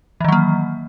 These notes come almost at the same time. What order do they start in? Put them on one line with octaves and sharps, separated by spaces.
E3 D#3 F#3 A#3